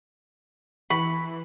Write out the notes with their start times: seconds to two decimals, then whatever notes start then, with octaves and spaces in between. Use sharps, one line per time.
0.90 E3 B5 C#6